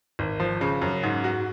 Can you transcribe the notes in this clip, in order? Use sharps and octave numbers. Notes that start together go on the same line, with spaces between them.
G#1
F3
C#3
F#2
G#2
F#4